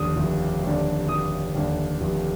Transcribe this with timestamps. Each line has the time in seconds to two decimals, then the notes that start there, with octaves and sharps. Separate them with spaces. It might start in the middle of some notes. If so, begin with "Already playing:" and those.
Already playing: F1 D#2 D3 D#6
0.16 F1
0.63 D#2 D3
1.08 F1 D#6
1.55 D#2 D3
2.01 F1